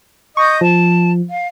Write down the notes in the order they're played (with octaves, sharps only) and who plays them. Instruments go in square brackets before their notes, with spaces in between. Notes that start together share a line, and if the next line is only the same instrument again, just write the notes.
[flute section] D#5 D#6 G6 [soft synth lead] C#6
[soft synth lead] F3 [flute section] A5
[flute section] F5